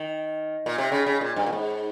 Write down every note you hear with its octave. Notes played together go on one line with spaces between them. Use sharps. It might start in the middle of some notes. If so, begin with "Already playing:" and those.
Already playing: D#3
A#2
C3
C#3
C#3
A#2
G2
A#2
G#2